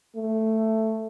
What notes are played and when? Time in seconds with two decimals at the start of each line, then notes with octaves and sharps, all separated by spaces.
0.15 A3